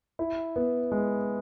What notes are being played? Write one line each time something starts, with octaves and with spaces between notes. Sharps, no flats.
E4
B3
G#3